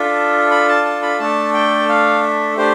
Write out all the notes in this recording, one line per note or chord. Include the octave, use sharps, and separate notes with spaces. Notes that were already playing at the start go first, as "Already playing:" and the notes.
Already playing: D4 F4 A4 E5
B5
A5
A5
B5
A3 D4 A4 A5
G5
F5
E5
A3 D4 G4 C5